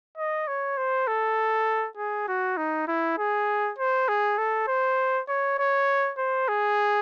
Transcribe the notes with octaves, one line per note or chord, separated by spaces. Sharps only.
D#5
C#5
C5
A4
G#4
F#4
D#4
E4
G#4
C5
G#4
A4
C5
C#5
C#5
C5
G#4